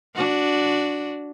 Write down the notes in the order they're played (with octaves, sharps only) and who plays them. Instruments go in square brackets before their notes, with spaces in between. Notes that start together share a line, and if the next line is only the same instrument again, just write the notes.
[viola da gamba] D4 F#4